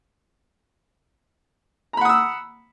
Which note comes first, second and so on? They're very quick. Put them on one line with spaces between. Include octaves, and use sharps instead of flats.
A#5 B5 F#5 D#6 E6